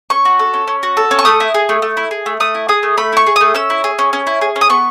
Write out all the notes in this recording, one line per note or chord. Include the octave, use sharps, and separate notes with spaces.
C#4 C#6
F#4
A4
C#4
C#4
F#4
A4
C#4
C#6
A3 D#6
E4
G#4
A3
A3
E4
G#4
A3
A3 D#6
E4
G#4 D#6
A3
A3 B5
E4 C#6
G#4
A3 D#6
C#4 E6
E4
G#4
C#4
C#4
E4
G#4
C#4
D#6
B3 C#6